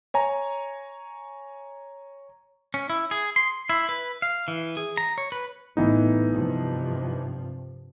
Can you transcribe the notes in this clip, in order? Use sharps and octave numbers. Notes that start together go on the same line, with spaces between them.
C#5 G#5 A#5
C#4
E4
G#4
C6
E4
B4
F5
E3
G#4
A#5
C#5
B4
A1 E3 B3 D#4
G2 C3 F3